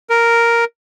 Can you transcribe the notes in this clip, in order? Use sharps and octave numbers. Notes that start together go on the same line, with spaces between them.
A#4